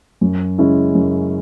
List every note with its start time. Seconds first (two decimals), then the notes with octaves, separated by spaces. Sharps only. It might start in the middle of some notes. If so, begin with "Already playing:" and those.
0.21 F#2
0.58 C#3 G#3 C#4 E4
0.95 F#2